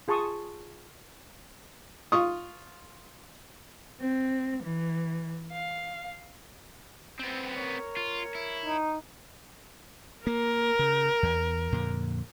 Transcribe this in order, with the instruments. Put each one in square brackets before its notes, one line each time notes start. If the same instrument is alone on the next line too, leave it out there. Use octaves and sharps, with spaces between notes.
[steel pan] F4 G#4 A5 C6 C#6 D#6
[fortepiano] F4 C#6 D#6
[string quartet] C4
E3
F5
[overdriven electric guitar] B3 C4
[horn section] A#4 C#5
[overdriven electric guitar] F4
E4
[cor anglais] D#4
[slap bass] A#3 [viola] A#4
[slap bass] C#3
E2
F2 A#2 D3